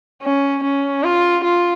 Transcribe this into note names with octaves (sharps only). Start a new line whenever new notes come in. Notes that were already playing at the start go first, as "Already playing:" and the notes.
C#4
C#4
F4
F4